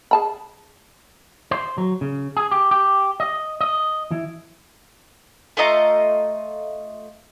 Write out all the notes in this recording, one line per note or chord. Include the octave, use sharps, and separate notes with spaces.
G#4 A5 B5
C5
F#3
C#3
G#4
G4
G4
D#5
D#5
E3
A3 F4 D#5 A#5